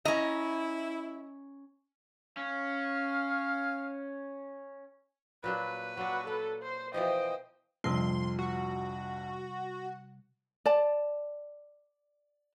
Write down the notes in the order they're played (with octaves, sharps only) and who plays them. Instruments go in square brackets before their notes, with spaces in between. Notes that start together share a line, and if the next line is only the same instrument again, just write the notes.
[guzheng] C#4 A#5 [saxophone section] E4 [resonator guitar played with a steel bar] D#5
[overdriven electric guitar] C#4 [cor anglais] F5
[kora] A#2 F#3 D4 [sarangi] B4
[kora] F#3 D4 [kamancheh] F#4
[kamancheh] A4 [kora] F#5
[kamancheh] C5
[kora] B2 E3 F3 [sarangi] C5 [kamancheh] D#5 G5
[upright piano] A#1 F2 [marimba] C3 G3 F6 [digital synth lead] C6
[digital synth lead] F#4
[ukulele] D5 A5